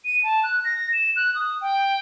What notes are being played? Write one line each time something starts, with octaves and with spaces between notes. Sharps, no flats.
D#7
A5
F#6
A#6
E7
F#6
D#6
G5